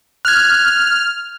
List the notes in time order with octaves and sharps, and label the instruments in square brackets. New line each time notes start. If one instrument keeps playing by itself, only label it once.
[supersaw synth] F6 [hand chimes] F#6 G#6